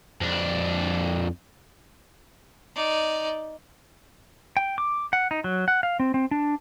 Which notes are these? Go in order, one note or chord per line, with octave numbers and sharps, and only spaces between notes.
F2 D4
D#4 D5
G5
D6
F#5
D#4
F#3
F#5
F5
C4
C4
D4